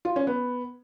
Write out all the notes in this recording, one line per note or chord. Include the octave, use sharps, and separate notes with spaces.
F4
C#4
B3